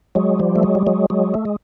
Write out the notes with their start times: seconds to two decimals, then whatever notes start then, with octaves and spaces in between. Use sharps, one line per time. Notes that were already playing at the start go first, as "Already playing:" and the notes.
0.15 F#3 G#3
0.39 F3 G3
0.56 A3
0.63 F#3 G#3
0.75 G3
0.87 F#3 G#3
1.10 F#3 G#3
1.34 A3
1.45 G#3